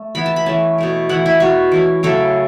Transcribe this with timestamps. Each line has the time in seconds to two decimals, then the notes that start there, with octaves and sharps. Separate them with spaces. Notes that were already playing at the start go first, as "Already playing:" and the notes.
Already playing: A3
0.15 E3 B3 E4 B5
0.26 A5
0.36 B5
0.46 E3 A3 C#4 A5
0.78 B2 A3 E4
1.09 E3 A3 E4 F#5
1.26 E4
1.40 B2 A3 E4 F#4
1.72 E3 C#4 E4
2.03 C#3 F#3 A3 E4 A4